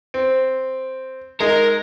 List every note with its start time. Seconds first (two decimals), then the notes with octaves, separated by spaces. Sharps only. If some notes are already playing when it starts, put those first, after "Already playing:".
0.14 C4
1.40 G#3 D#4 A#4